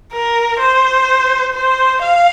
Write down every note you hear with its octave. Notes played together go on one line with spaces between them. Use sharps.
A#4
C5
C5
F5